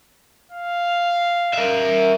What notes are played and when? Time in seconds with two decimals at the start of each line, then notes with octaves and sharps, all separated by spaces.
0.52 F5
1.54 A#4 E5